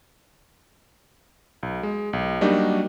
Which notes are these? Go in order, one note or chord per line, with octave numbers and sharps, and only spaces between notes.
B1
G#3
B1
F#3 G3 A#3 D4 D#4 F#4